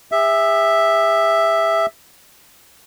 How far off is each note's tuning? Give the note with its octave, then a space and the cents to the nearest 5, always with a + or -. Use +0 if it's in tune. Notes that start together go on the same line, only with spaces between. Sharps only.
G#4 -45 E5 +0